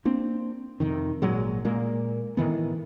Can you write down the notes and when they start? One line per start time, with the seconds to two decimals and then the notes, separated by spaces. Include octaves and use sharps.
0.05 A#3 C4 D4
0.80 F2 C3 D#3
1.22 G#1 A#2 F#3 G#3
1.65 A#2 G#3 A#3
2.37 A2 D#3 E3 B3